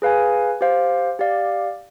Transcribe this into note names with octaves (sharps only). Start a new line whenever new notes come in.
G#4 B4 F5 G#5
G4 C5 F5
G4 D5 F5